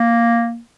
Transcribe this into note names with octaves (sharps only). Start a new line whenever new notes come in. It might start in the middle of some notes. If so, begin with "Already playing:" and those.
Already playing: A#3